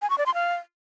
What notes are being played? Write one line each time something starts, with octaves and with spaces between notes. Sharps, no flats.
G#5
C#6
D5
C6
F5